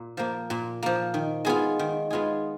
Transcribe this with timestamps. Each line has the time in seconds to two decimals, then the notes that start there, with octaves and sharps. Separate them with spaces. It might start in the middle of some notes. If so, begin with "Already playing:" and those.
Already playing: A#2
0.17 F3 A#3
0.50 A#2
0.83 F3 A#3
1.14 D#3
1.45 G#3 B3 F4 G#4
1.79 D#3
2.10 G#3 B3 F4 G#4